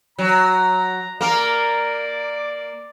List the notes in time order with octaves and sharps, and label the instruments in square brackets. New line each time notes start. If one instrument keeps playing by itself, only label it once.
[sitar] F#3 [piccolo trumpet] A#5
[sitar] A#3 A#4 [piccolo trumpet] D5